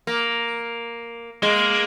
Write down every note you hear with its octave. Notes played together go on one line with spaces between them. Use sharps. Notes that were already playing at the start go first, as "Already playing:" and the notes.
A#3
G#3 A#3